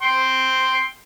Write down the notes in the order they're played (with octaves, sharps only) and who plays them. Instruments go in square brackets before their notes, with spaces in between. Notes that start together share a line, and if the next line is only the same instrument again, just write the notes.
[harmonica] G5 C6